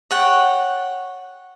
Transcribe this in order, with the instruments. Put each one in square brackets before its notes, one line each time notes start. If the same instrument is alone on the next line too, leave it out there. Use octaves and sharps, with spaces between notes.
[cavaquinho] C#5 F#5 G5